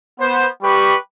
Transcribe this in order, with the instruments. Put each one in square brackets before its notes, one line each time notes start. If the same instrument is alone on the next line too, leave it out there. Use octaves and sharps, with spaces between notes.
[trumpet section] B3 C5
G3 G4 B4 B5 C#6